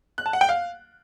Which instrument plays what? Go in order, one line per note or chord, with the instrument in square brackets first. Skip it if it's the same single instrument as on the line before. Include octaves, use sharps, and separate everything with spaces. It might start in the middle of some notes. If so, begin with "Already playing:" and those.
[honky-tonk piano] F#6
A5
F#5
G5
F5